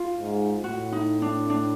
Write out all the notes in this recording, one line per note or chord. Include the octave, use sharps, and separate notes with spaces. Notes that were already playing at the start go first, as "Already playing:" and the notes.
Already playing: F4
G#2
A2 F#4
D#4
D4
D4